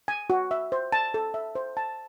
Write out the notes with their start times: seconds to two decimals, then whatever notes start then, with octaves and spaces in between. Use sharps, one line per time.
0.08 G#5
0.30 F#4
0.51 E5
0.72 C5
0.92 A5
1.14 A4
1.34 E5
1.55 C5
1.77 A5